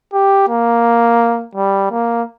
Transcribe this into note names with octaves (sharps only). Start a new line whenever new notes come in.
G4
A#3
G3
A#3